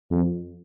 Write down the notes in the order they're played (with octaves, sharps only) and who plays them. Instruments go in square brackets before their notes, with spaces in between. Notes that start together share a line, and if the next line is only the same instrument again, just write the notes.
[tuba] F2